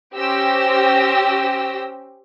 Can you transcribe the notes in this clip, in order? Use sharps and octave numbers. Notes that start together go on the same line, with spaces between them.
C#4 G4 C5 G5 E6 A#6